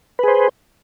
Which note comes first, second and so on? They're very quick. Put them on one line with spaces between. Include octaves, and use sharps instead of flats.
B4 G#4 C5